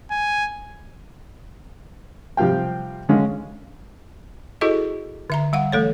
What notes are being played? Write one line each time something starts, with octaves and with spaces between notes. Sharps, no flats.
G#5
C3 F3 G3 F5 G5
D3 G#3 C#4 F5
E4 F#4 G#4 A4 D#5
D3 E5 A#5
G3 F5 F#5
E3 A3 A4 C#5